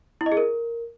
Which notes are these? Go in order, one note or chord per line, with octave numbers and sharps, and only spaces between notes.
E4
D#5
G#4
A#4